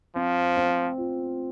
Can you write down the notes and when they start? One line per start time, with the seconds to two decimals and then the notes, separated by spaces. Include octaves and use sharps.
0.16 F3 C4
0.57 C4
0.98 F4